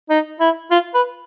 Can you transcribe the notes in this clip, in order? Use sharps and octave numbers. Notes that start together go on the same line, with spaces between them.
D#4
E4
F4
B4